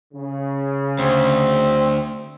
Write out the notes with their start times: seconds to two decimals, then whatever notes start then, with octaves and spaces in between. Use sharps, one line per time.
0.13 C#3
0.99 D2 C4